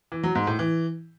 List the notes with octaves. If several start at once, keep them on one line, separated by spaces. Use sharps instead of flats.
E3
F#3
G#2
A2
E3